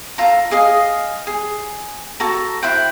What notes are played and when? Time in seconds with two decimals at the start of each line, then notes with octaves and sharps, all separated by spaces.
0.18 F4 A4 A#5
0.51 G#4 D#5 F5
1.27 G#4
2.20 F#4 A4 A#5
2.63 E4 C5 F#5 G5